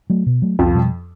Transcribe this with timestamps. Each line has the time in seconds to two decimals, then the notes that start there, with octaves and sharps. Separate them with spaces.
0.10 F#3 A3
0.26 B2
0.42 F#3 A3
0.59 C2 F2 F3
0.75 B2 G3